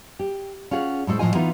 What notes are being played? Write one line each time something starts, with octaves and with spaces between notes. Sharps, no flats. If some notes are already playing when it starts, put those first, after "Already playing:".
G4
C#4 F4 G#4 F#5
A2 G#3 A4 C5
A2 F3 E4 F4 D#5 G#5
E3 B3 D#4 F4